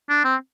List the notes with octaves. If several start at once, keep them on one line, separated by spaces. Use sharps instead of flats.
D4
C4